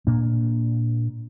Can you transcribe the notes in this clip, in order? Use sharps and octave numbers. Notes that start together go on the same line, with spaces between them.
A#2 A#3 D4